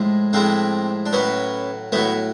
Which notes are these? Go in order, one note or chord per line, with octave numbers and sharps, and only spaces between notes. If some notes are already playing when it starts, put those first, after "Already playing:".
Already playing: A2 F3 G#3
A2 F3 G#3 C4 D4
D4
A2 F#3 B3 C#4
A2 F#3 A3 B3